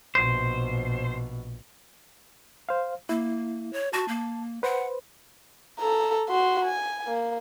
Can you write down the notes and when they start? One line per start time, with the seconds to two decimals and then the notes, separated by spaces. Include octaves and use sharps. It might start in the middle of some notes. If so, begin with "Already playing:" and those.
0.15 A#1 B2 C5
2.69 C5 F5
3.09 A#3 E4
3.73 C#5
3.93 F#4 A5
4.08 A#3
4.63 B4 C5 F#5
5.79 A4 A#5
6.29 F#4 C6
6.65 G#5
7.07 A#3